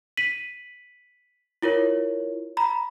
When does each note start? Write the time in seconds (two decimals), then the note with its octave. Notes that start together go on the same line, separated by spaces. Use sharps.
0.17 B6 D#7 F#7
1.62 E4 F4 A#4 C#5
2.57 A#5 B5